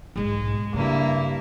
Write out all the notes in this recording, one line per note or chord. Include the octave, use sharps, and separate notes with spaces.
B1 G#2 G#3
G2 C#3 A#3 E4